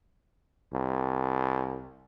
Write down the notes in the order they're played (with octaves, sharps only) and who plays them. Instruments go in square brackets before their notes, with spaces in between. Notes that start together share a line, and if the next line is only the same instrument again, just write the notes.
[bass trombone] C2